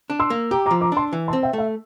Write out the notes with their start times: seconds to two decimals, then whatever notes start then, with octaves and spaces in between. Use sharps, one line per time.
0.10 D4
0.20 C6 E6
0.30 A#3
0.51 G4 A#5 D6
0.66 A#5 D6
0.71 F3
0.81 A#5 D6
0.92 D4 A5 C6
1.13 E3
1.28 A5 C6
1.33 C4
1.43 E5 G5
1.53 A3 E5